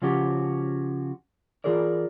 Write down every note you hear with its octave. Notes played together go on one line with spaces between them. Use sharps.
C#3 F3 C#4 F#4 G4
E3 F4 G#4 A#4 D5